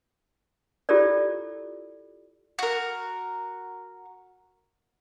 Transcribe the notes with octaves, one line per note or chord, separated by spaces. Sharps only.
E4 F4 G4 A4 A#4 D5
F#4 A#4